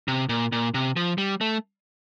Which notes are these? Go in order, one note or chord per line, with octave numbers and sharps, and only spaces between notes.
C3
A#2
A#2
C3
F3
G3
A3